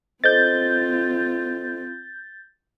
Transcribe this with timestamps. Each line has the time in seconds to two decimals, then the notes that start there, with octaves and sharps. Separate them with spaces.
0.24 C4 F4 A4 C5 D#5 G6 A6